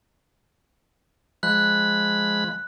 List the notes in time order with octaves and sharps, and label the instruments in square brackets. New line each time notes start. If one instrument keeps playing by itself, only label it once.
[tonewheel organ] F3 G#3 B5 [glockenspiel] F#6